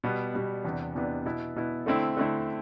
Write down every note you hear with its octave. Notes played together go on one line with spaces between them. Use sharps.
B2 G3 B3
B2 G3 B3
E2 C3 E3 B3 D4
E2 C3 E3 B3 D4
B2 B3 E4
B2 B3 E4
D3 A3 C4 E4
D3 A3 C4 E4